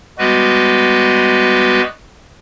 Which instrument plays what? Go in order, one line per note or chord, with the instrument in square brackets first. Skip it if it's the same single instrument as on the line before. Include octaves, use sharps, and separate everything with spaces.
[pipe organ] G3 G#3 B3 F#4 B4